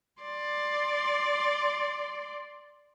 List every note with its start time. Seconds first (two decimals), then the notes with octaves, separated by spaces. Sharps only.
0.23 D5 C6